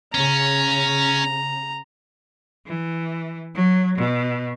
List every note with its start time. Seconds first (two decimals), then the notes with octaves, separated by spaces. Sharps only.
0.15 C#3 C#4 A#5
2.67 E3
3.55 F#3
3.98 B2